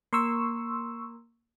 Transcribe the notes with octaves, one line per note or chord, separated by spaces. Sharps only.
A#3 C6 C#6 E6